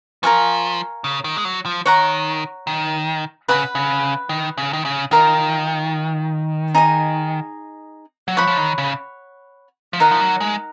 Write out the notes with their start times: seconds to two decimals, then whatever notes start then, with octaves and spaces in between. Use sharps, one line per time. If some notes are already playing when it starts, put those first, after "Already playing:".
0.23 F3 A#4 F5 G#5 C#6
1.04 C#3
1.24 D#3
1.37 G#3
1.45 F#3
1.65 F3
1.86 D#3 C#5 F#5 A#5
2.67 D#3
3.48 C#3 B4 F#5 B5
3.75 C#3
4.29 D#3
4.58 C#3
4.73 D#3
4.85 C#3
5.11 D#3 F4 A#4 D#5
6.75 D#4 G#4 D#5
8.28 F#3
8.37 F3 C#5 F#5 B5
8.47 F3
8.58 D#3
8.78 C#3
9.93 F3
10.00 D#3 D#4 A#4 D#5 F#5
10.11 F3
10.20 F#3
10.40 G#3